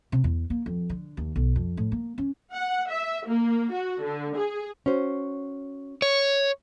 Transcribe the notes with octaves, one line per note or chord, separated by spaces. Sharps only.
C3
E2
A#3
F2
D3
D#2
B1
F2
A2
A#3
C#4
F#5
E5
A#3
F#4
D3
G#4
C#4 F#4 C5
C#5